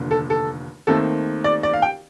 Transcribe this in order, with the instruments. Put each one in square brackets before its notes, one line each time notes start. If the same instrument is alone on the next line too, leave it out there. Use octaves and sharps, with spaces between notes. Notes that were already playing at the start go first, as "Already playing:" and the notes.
Already playing: [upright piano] F1 D#2 D3
A4
A4
D#2 D#3 A3 C4 A4
D5
D5
F5
G5